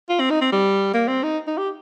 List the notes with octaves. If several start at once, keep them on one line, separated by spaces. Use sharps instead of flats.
F4
C4
D#4
C4
G3
A#3
C4
D#4
D#4
G4